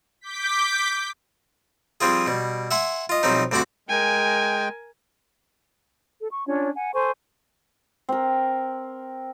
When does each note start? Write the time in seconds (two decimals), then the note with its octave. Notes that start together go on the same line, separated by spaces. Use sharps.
0.21 D6 G6 B6
2.01 F3 G3 C4 F4 G#4
2.26 B2 G3
2.71 E5 F#5 G#5 C6
3.09 F4 D#5
3.23 B1 F3 G3 C4 D#4
3.51 D2 G2 C4 D4 F#4 D6
3.89 G#3 A#4 G5 G#5
6.19 A4
6.31 C#6
6.46 C#4 D4 F4 C#5
6.75 F#5 G#5
6.93 A4 C5 G#5 C#6
8.09 C4 A#4